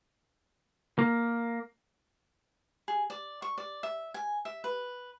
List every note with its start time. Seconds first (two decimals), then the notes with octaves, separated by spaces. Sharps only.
0.99 A#3
2.88 G#4
3.10 D5
3.42 C#6
3.58 D5
3.83 E5
4.14 G#5
4.45 E5
4.64 B4